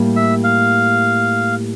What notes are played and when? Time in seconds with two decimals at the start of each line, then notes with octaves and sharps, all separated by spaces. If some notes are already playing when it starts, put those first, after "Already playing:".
Already playing: A2 G3 A#3
0.16 E5
0.44 F5